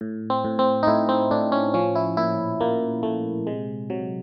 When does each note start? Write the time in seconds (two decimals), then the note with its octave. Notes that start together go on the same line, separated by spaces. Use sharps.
0.01 A2
0.30 C4
0.44 A2
0.59 C4
0.83 D#4
0.87 A2 E4
1.09 C4
1.31 A2 D4
1.52 C#4
1.74 F3 C#4
1.96 E4
2.17 A#2 E4
2.61 A#2 A#3
3.03 A#2 A3
3.47 C3 G#3
3.90 C3 F#3